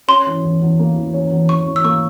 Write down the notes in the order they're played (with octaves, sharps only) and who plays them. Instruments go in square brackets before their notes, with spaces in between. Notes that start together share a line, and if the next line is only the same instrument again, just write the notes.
[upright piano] C#4 [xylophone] C6
[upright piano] E3
E2
E2
A#3
E3
C#4
E2
[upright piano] E2 [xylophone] C#6
[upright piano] E3
[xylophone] E6
[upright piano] A#3 [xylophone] C#6